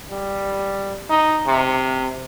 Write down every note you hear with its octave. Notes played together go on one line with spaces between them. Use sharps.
G3
D#4
C3